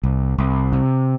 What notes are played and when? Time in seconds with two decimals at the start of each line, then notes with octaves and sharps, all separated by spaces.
0.03 C2
0.38 C2
0.73 C3